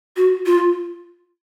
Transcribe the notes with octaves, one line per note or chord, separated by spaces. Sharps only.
F#4
F4